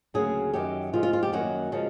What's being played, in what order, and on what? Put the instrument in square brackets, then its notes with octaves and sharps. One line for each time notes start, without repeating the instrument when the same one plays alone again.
[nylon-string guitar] D2 C#3 F#3 A#3 G#4
F#2 D#3 F#3 G4
C3 F3 G#3 F4
F4
F4
G4
F#2 D#3 F#3 A#3 C#4 F#4
C#3 F3 G#3 C#4